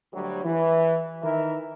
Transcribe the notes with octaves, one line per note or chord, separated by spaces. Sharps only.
D2 F#3 G3
E3
D#3 E3 A#4 E5